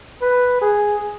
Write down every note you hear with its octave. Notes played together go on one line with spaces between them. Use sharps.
B4
G#4